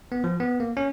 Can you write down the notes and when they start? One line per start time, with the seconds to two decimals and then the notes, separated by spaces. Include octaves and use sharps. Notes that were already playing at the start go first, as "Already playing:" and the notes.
0.12 B3
0.24 F3
0.40 B3
0.60 A#3
0.77 C#4